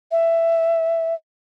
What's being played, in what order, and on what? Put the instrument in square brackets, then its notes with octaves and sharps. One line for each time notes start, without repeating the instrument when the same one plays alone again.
[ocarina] E5